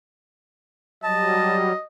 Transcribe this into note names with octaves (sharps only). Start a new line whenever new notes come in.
F#3 G3 D#5 A5